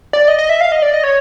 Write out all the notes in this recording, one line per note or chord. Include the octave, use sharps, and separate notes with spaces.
D5
D#5
D#5
E5
F5
D#5
D5
D#5
C#5